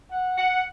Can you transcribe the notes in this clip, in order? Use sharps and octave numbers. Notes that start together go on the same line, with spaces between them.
F#5
F#5